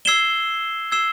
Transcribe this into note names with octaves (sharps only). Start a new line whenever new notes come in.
E6 G#6 C7 E7 G7
E6 G#6 C7 E7 G7